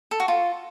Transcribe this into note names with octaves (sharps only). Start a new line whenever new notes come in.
A4
F#4
F4